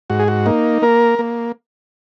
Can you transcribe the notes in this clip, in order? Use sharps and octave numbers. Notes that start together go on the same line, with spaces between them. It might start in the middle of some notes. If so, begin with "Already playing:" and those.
G#2 F#4
G#4
F#4
A#3 D#4
A#3 A#4
A#3